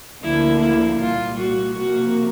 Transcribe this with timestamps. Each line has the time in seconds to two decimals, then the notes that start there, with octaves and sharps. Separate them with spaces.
0.23 D2 D3 F3 A#3 E4
0.61 E4
1.00 C2 A#2 G3 F4
1.38 F#4
1.76 C3 F3 A#3 F#4